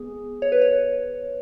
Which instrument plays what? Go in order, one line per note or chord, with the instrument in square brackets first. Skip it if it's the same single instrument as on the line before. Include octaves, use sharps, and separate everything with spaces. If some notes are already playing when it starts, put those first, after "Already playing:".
Already playing: [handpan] B3 G#4
[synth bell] C#5
B4
C#5